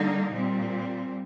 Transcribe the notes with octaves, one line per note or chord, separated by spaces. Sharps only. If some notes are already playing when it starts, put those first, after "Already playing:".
Already playing: D3 G3 A#3 D#4
A#2 G3 C4